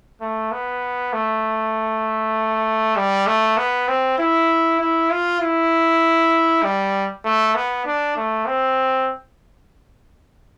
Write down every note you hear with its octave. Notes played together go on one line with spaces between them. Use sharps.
A3
B3
A3
G3
A3
B3
C4
E4
E4
F4
E4
G3
A3
B3
D4
A3
C4